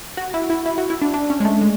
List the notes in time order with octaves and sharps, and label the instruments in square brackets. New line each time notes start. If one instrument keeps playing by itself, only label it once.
[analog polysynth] F#4
E4
E4
E4
F#4
E4
D4
D4
C#4
G#3
A3
G#3